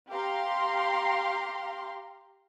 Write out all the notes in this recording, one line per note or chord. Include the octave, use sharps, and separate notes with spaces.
G4 F5 A#5 C6